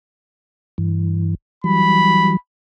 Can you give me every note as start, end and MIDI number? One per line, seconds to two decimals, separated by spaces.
0.78 1.35 43
0.78 1.35 52
1.64 2.37 52
1.64 2.37 54
1.64 2.37 55
1.64 2.36 83